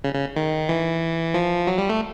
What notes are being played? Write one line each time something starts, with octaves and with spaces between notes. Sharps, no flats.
C#3
C#3
D#3
E3
F3
F#3
G3
A3